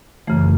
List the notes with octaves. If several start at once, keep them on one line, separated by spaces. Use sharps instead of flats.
F#2 C#3 E3 A3